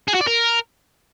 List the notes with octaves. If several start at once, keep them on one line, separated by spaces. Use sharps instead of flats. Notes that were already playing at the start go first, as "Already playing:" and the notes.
G#4
F#4
D5
A#4